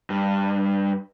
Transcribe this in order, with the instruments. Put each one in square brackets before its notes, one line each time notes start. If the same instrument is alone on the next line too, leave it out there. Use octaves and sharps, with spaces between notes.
[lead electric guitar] G2